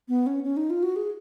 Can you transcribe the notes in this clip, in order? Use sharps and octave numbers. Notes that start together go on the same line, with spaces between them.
B3
C#4
C#4
D#4
F4
F#4
G#4